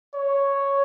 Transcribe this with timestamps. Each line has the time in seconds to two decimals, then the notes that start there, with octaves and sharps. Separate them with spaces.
0.15 C#5